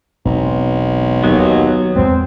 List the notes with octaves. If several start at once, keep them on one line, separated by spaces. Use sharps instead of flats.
E1 B1 C4
D#2 F#3 B3
E2 G#3 C4